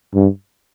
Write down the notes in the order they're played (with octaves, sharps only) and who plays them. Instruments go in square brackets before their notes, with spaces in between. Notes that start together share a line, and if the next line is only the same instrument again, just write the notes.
[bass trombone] G2